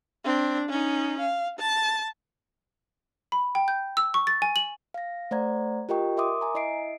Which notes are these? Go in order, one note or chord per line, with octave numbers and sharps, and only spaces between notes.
C4 D4
C#4 D#4
F5
A5
B5
G5
G6
E6
C#6
A6
G#5
F#7
F5 A#6
A3 C5 D5 F#5 A#5 G#6
F4 G4 A#4 D#5 G5 C#6
A#4 E5 C6 D6 D#6
G#5 A#5
E4 D#5 E5 C7 D7